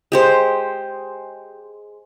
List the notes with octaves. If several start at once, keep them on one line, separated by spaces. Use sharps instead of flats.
G#3 G4 C5